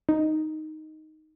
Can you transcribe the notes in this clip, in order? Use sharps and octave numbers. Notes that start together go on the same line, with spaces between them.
D#4